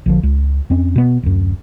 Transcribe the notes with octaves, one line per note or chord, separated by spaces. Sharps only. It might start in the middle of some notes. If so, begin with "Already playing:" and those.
A#1 D3 F3
C#2
F2 C4 C#4
B2 B3
D1 F#2